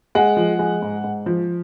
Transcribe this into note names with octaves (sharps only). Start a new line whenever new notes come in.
G#3 F#5
F3
G#3
G#2
G#2
F3